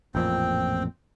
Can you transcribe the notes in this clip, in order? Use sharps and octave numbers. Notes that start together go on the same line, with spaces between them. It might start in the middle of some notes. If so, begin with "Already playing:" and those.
A1 F2 A#2 C4 G5